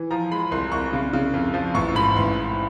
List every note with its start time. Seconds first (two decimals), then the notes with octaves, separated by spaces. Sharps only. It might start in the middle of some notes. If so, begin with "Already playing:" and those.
Already playing: E3
0.11 F3 A#5
0.31 G#3 B5
0.51 C2 C6
0.72 C2 C#6
0.93 C#3
1.13 C#3
1.34 F2
1.54 F3
1.74 A1 C#6
1.95 G#2 B5
2.16 A1 C6
2.36 G#2